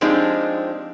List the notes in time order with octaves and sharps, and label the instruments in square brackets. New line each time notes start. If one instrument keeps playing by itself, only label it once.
[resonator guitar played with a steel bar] F3 G#3 C4 D4 D#4 G4